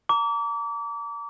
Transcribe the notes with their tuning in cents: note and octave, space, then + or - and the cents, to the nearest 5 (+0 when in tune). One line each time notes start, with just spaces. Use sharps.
A#5 -25 D6 -35